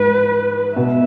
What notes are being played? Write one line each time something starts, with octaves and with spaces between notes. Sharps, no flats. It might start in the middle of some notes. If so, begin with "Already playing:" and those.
Already playing: G#2 B4
B2 E5